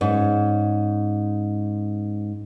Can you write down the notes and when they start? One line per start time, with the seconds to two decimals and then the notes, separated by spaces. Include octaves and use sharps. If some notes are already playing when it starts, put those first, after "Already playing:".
0.01 G#2 C#4